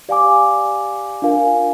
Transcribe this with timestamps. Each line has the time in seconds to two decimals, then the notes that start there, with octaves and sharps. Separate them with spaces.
0.09 G4 D5 F5 G#5 D6
1.22 D4 F4 A#4 F5 G#5